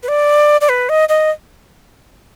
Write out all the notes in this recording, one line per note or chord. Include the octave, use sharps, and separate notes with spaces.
B4
D5
D5
B4
D#5
D#5